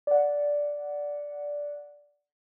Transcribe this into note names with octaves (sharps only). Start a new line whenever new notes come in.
D5 F#5